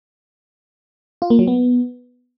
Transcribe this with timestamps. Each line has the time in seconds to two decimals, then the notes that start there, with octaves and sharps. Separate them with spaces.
1.22 F4
1.30 A#3
1.39 F#3
1.47 B3